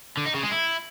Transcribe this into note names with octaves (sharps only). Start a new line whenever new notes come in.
D3
D#4
C#3
G#3
E4